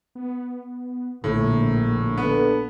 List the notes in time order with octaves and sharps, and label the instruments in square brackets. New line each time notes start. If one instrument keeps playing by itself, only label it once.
[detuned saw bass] B3
[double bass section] A#1 A#3 [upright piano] A2 [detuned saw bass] D3
[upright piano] B3 [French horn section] D4 A4 B4